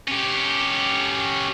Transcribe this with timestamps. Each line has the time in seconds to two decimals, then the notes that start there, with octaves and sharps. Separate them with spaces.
0.08 C#4 G4